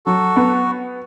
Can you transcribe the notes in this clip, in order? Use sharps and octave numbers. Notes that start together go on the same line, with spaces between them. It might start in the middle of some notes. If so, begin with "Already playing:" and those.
F#3 F#4 A4
B3